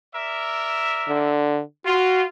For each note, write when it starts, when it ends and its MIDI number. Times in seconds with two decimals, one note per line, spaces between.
0.15 1.35 70
0.15 1.35 74
0.15 1.35 76
1.09 1.61 50
1.86 2.28 65
1.86 2.23 66